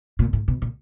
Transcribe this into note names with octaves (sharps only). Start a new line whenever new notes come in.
A#2
A2
B2
A#2